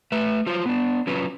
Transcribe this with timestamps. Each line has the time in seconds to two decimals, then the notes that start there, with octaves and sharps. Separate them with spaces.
0.12 A3 B4 E5
0.46 F#3 F4 C5
0.66 B3 D4
1.07 F#3 C#4 F4 B4